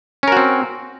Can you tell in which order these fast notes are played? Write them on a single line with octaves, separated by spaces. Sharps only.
C#4 A#4 F#4 C4